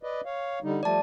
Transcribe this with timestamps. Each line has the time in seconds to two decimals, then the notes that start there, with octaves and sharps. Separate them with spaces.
0.03 B4 D5 D#5
0.25 C#5 F5
0.63 D3 G3 D#4
0.83 F3 G3 A3 D5 A5